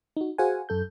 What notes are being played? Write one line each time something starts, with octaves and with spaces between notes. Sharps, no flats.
D#4 F#4
F#4 G#4 C5 F5 F#5 G#5
F#2 A4 G6